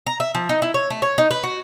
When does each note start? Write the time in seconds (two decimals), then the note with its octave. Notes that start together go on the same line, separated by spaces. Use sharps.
0.07 A#5
0.20 E5
0.35 F3
0.49 D#4
0.62 E4
0.74 C#5
0.90 A3
1.02 C#5
1.18 D#4
1.31 B4
1.43 F#4